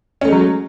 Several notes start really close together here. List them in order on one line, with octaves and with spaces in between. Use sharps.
C#4 A3 G#3 F#3